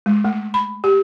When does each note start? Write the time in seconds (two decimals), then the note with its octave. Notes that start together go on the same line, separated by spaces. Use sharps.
0.06 G#3
0.25 A3
0.54 B5
0.84 G4